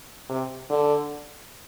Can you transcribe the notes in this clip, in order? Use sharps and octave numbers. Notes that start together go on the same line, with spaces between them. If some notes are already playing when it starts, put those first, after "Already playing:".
C3
D3